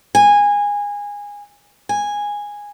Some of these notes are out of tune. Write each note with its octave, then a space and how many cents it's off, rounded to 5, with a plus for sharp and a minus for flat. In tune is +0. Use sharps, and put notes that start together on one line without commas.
G#5 -20
G#5 -10